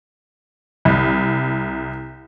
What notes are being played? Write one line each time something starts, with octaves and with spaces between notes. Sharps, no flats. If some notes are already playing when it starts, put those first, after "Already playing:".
C2